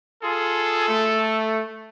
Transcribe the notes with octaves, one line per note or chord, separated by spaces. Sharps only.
F4 G#4 A4
A3